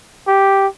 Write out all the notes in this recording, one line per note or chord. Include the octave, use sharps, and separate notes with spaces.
G4